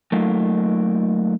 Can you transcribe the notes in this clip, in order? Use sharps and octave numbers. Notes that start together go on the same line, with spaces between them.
F#3 A3 A#3 D#4 F4